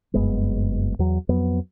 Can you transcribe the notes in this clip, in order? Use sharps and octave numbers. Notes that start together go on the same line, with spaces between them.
F#1 G2 G#3 B3
E2 F#3
F2 F#3 B3